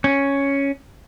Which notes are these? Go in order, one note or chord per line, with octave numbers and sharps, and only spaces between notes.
C#4